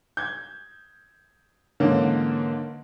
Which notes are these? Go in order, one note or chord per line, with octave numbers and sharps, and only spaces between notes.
G6 G#6
G#2 D3 E3 A#3 C#4